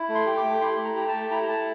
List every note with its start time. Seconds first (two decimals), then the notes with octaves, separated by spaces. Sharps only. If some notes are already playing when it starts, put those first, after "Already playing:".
Already playing: E4
0.09 A3
0.15 C6
0.26 G4
0.37 D6
0.43 A3
0.61 E4 C6
0.78 A3
0.84 A#5
0.96 G4
1.08 A5
1.13 A3
1.31 E4 A#5
1.48 A3 A5